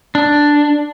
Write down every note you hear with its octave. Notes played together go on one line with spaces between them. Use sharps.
D4